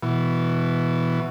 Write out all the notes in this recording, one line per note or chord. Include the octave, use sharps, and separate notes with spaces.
B2 E3